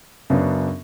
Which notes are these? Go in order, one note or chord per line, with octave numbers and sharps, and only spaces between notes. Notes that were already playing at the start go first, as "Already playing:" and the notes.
F#2 C#3 F#3 B3 D4